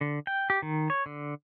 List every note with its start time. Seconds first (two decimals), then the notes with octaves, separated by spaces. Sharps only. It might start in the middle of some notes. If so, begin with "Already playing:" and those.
0.01 D3
0.27 G5
0.50 G4
0.62 D#3
0.90 C#5
1.06 D3